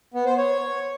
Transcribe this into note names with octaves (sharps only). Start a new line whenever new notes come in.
B3
C5
C#5